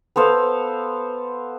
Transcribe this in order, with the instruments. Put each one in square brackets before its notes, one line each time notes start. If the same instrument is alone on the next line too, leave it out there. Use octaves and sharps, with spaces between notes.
[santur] B3 A4 C5 F5